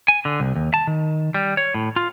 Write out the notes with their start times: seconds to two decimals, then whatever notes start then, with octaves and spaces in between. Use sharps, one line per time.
0.08 G#5
0.25 D3
0.40 C2
0.55 D#2
0.74 A5
0.87 D#3
1.34 G3
1.57 C#5
1.75 A2
1.96 F4